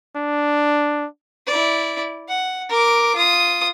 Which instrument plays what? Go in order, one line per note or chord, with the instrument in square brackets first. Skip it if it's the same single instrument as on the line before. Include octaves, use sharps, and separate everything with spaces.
[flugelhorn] D4
[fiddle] E4 D5
F#5
A#4 D6
F4 D#6